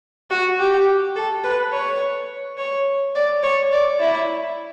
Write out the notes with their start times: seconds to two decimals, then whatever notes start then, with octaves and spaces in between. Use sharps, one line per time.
0.30 F#4
0.59 G4
1.16 A4
1.44 B4
1.73 C#5
2.58 C#5
3.15 D5
3.43 C#5
3.72 D5
4.00 E4